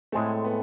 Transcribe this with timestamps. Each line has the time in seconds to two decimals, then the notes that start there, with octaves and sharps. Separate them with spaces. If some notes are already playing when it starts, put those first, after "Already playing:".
0.12 A2 G#3 A3 C4 G#4
0.45 B3